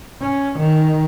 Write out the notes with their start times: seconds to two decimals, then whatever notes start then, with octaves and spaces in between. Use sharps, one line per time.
0.21 C#4
0.59 D#3